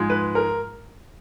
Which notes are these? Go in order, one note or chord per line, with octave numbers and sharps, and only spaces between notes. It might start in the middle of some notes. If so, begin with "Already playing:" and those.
Already playing: G#2 F3 G#3
B4
A#4